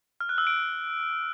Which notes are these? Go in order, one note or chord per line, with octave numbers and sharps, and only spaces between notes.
F6
F#6
E6
D7